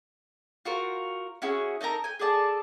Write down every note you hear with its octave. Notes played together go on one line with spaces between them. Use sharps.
F4 F#4 A#4 C5
C#4 E4 F#4 G#4
D#4 A4 A#4 A#5
G5 G#5
G#4 A4 D5 A5